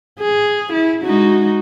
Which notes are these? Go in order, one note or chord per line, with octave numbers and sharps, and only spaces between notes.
G#4
E4
G#3 D#4 F#4